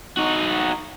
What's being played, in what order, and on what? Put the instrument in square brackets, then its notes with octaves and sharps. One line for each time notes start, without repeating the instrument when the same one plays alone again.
[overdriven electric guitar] D#4 F#4